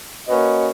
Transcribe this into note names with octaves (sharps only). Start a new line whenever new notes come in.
A#3 C#4 F#4 B4 D#5